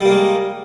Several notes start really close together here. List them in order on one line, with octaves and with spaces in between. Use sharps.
G3 A#3 G#3